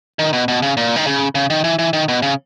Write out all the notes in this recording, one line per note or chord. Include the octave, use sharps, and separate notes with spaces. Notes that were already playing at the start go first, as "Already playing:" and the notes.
D#3
B2
B2
C#3
A#2
D#3
C#3
C#3
D#3
E3
E3
D#3
B2
C#3